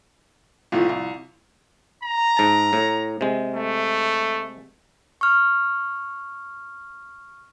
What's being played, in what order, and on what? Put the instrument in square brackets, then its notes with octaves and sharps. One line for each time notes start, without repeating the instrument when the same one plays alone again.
[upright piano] C2 A2 F3 [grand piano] F4
[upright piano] C2
[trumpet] A#5
[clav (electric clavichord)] G#2 A5
A2
C3 G#3
[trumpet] A3
[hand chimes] C#6 F6